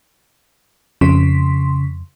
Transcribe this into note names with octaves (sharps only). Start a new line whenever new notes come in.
F2 C#3 C6 B6